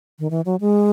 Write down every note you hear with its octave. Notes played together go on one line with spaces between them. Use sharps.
D#3
E3
F#3
G#3